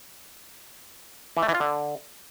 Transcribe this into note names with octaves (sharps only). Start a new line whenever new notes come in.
E3
A3
E3
F4
D3